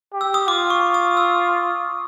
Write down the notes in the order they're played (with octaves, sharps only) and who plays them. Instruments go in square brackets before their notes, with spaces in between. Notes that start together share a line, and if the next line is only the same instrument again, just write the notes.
[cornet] G4
[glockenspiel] E6
D#6
[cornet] F4 [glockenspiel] D6
[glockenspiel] C#6
D#6
E6